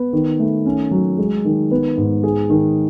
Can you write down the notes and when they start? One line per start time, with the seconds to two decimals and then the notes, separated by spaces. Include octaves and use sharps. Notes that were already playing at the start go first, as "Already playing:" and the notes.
Already playing: B3
0.13 D#3
0.39 A3
0.66 C#4
0.91 F#3
1.18 G#3
1.45 D#3
1.71 B3
1.97 G#2
2.23 G#4
2.50 D#3